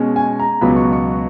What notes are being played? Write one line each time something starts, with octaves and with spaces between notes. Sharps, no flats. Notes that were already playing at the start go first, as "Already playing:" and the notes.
Already playing: B2 G#3 C#4
G#5
A#5
C#2 B2 F#3 B3 B5
C#6
C#6